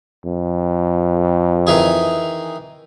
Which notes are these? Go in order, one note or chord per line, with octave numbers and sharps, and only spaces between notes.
F2
D#3 E3 G#4